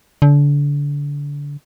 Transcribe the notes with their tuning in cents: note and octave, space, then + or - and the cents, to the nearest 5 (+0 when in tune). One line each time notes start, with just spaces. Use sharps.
D3 -30